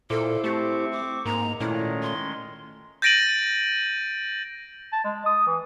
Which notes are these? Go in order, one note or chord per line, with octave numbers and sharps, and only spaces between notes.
A#2 E4 A4 C5 D6
A3 C4 G4 C#6
D6
G#2 A#3 A#5
A#2 D#3 G#3 A3 C#4 E4
C6
G6 A6 A#6 D7 D#7 F#7
A5
G#3
D#6
E3